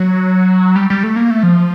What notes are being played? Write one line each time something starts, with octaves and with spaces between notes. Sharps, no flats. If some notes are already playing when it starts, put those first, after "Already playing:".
Already playing: F#3
G3
G3
A3
A#3
A3
F3